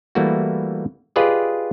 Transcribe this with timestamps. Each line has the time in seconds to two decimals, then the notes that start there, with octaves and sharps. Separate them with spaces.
0.15 E3 G3 A3 A#3 E4 F#4
1.16 F4 G4 G#4 B4 D5 D#5